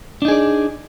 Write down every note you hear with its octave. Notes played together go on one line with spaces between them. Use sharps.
D4 D#4 G#4 D5